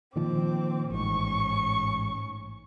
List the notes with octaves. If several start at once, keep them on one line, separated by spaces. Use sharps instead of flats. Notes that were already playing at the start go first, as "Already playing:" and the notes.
A#2 D#3 F3 C4 D6
A1 G#2 C#4 C#6